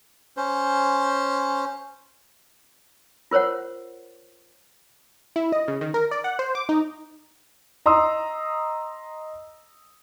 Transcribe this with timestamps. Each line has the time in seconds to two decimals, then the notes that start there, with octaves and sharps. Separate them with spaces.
0.37 C#4 C5
3.31 F4 A#4 C5 C#5 F#5
5.36 E4
5.52 D#5
5.68 C#3
5.81 D#3
5.94 A#4
6.11 D5
6.24 F#5
6.39 C5
6.55 D6
6.69 D#4
7.86 D#5 A#5 C6 D#6 E6